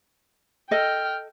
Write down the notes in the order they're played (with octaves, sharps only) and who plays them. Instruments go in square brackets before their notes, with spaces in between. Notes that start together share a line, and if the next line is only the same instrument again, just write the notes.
[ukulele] A4 D#5 [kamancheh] G5 F6